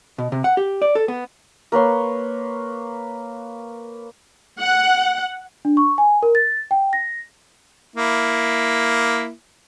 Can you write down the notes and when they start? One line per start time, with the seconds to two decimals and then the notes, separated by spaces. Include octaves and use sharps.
0.18 B2
0.32 C3
0.44 F#5
0.57 G4
0.82 D5
0.95 A4
1.08 B3
1.72 A#3 B4 C#5 C6
4.60 F#5
5.65 D4
5.77 C#6
5.98 G#5
6.23 A#4
6.35 A6
6.71 G5
6.93 A#6
7.96 A#3 E4